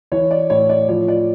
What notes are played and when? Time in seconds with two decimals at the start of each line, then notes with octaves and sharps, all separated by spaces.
0.12 E3 C#5
0.31 D5
0.50 A2 C#5
0.69 D5
0.89 F3 C#5
1.08 D5